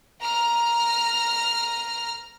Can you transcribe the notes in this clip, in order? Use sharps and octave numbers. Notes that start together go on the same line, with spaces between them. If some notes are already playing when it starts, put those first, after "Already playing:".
A#5 F6